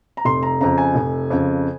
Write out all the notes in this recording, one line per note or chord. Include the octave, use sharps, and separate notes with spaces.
A#5
F1 C6
A#5
F2 C#3 A#5
G#5
F1
F2 C#3